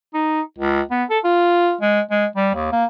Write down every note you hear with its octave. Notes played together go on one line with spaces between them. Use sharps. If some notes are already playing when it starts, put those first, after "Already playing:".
D#4
C#2
B3
A4
F4
G#3
G#3
G3
D#2
A#3